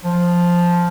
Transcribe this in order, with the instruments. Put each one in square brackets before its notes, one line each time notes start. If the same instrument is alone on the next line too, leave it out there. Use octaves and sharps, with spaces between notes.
[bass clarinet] F3